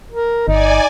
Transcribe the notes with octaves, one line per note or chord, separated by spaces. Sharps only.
A#4
G1 D#4 D5 G#5